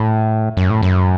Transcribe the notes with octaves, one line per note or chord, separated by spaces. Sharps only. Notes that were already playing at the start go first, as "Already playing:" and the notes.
Already playing: A2
F#2
A2
F#2